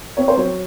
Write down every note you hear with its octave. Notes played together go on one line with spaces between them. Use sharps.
C4 C#5
C5
F#3 C#5